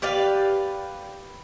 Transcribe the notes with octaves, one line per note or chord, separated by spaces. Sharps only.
G4 B4 D5 F5